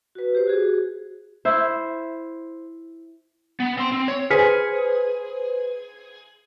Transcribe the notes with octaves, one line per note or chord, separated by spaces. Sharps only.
F#4 B4
G4 C5
F#4 G#4
E4 C5
B3
C4 C6
C4
C#5
G#4 B4 C5 F6 B6 C#7